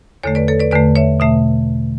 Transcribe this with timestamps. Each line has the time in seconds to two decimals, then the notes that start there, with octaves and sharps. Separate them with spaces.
0.23 E2 D3 A3 A4 C#5
0.35 B4 D5
0.48 A4 C#5
0.60 B4 D5
0.71 E2 D3 A3 B4 D5
0.96 C#5 E5
1.20 B2 A3 E5